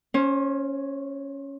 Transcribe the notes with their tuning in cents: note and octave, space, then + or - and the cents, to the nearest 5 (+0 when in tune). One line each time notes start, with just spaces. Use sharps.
C#4 +0 C5 +30